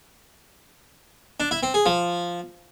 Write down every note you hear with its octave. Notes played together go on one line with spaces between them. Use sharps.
D4
E4
C4
G#4
F3